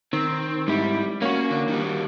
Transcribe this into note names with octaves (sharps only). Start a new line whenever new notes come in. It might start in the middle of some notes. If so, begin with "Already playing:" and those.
D#3 C4
G#2 G3 E4
A#3 C#4 F#4
D3
D#3 G3